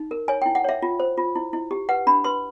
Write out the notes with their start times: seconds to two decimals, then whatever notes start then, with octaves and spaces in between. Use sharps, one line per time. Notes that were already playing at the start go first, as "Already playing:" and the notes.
Already playing: D#4
0.11 A#4
0.28 C#5 G#5
0.42 G5
0.46 E4
0.55 F#5
0.64 C#5 E5
0.82 F4
1.00 C5
1.17 F4
1.35 E4
1.53 E4
1.71 G4
1.89 B4 F#5
2.07 D4 B5
2.24 B4 C6